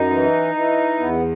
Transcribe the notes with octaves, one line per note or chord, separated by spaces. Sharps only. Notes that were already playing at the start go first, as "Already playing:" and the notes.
Already playing: F#2 D#4
E3
E3
E2 B3